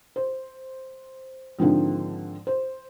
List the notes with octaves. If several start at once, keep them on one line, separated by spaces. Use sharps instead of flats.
C5
G#2 D3 D#3 F3 C4
C5